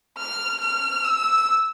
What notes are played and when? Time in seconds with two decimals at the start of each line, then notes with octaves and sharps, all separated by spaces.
0.18 F6
0.61 F6
1.04 E6